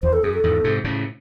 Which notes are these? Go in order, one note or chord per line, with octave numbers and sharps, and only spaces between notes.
E2 C5
A4
F#2 G#4
A4
E2 G#2
G#2 C3
A2 C#3